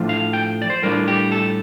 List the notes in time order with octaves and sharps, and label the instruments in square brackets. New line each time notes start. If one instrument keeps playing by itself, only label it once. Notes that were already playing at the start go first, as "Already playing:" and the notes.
Already playing: [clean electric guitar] A2 F3 A3 D4 F4
F5
G5
D5
C5
A2 G3 D4 F4 A#4
G4
A4